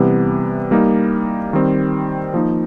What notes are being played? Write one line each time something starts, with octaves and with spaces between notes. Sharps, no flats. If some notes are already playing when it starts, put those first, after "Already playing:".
Already playing: C3 E3 G3 B3
G3 A#3 D#4
D#3 G3 C4
F3 A#3 D#4